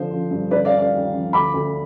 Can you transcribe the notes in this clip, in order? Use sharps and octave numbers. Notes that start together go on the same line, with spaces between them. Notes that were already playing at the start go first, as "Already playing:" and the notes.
Already playing: D3 F3 C5
F3
G2
D3 B4 D5
D5 F5
D3
D5 F5
D#2
F3
D2 B5 D6
D2